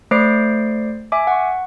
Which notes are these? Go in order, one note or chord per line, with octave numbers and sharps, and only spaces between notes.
A3 C5 D5 D6 C7 D7
E5 G#5 D6
F#5 C#6